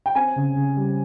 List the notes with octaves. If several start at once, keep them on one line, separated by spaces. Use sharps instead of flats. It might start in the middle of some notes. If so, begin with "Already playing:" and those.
G5
C4 G#5
C#3
C#3
G3